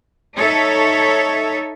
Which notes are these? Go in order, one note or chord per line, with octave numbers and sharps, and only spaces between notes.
D#4 A4 C#5 E5